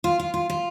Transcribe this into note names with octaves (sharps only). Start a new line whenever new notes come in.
F4
F4
F4
F4